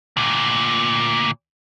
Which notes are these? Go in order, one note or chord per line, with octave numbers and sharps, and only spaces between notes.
D2 A#2